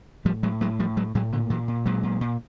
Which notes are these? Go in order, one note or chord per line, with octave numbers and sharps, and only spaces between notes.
A2 F3 G3
A2 F#3 G#3
A2 F#3 G#3
A2 F3 G3
A2 F#3 G#3
A2 F#3 G#3
A#2 D3
A#2 E3 F#3
A#2
A#2 F#3 G#3
A#2
A#2